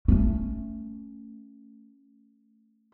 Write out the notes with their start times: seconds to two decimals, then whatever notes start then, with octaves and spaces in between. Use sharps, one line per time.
0.08 A3 C#4